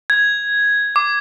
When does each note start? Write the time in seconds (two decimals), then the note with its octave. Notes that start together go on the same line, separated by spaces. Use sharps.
0.10 G#6
0.96 D6